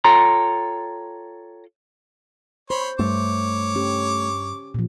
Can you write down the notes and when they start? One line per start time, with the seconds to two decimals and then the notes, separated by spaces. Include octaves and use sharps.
0.04 F4 A4 C#5 G5 A#5 C6
2.70 C5 C#5 B5 C6
2.99 G2 A3 C#5 D6
3.75 C#4 G4
4.74 A#2 F3